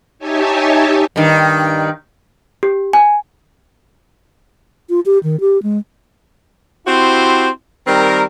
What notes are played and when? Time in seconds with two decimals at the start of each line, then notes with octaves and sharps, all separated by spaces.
0.19 D#4 G4 C#5 E5 G#5 A5
1.16 G2 D#3
2.63 G4
2.93 G#5
4.90 F4
5.06 G4
5.23 D#3
5.40 G4
5.63 G#3
6.86 C4 E4 F#4 G4 C5
7.87 D#3 G3 C4 A#4